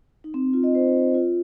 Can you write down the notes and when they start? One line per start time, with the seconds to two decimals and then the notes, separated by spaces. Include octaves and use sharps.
0.24 D#4
0.34 C4
0.53 F4
0.64 D#5
0.75 C5
1.14 F4